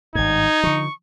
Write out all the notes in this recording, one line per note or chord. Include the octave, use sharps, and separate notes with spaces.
G#1 G2 D#4 G#6
D3 F3 C#6